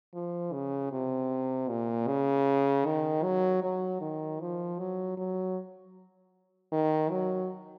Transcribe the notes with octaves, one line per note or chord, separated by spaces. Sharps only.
F3
C#3
C3
A#2
C#3
D#3
F#3
F#3
D#3
F3
F#3
F#3
D#3
F#3